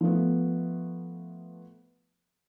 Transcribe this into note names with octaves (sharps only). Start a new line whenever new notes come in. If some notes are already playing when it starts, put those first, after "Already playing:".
F3 A3 B3